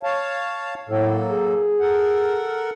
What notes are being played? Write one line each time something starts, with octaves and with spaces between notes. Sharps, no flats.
C#5 F5 A5
A2 F#3 A#3 A4
G#4
A4 A#4 F#5